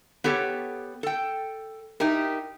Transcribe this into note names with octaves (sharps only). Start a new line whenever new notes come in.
B3 G4 A4 C#5
A4 G5
D#4 E4 G4 A#4